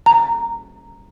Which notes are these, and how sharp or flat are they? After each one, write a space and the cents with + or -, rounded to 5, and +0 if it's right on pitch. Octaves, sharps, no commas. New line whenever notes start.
A#5 -5